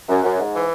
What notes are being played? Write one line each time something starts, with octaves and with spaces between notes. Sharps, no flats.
F#2
F#2
G#2
E3